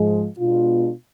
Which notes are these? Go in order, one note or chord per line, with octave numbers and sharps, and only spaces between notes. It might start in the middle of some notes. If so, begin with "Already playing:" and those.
Already playing: G#2 F3 G#3
B2 G#3 B3 D4 F4